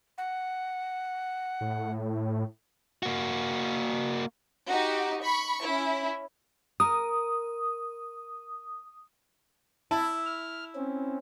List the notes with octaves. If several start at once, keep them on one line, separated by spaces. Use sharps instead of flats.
F#5
A2
A#3 F#4
D#4 F#4 G4
B5 C#6
C#4 E4
A#4 D#6
E4 A5
F6
C4 C#4